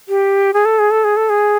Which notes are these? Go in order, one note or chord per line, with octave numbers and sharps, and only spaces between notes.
G4
G#4
A4
G#4
A4
G#4
A4
G#4